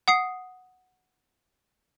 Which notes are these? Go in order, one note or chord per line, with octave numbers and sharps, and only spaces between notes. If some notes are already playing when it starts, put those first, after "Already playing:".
F#5 D#6 C7